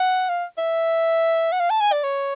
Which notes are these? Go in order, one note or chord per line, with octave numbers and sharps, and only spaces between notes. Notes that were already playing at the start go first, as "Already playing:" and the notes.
Already playing: F#5
F5
E5
F#5
F5
A5
G#5
D5
C#5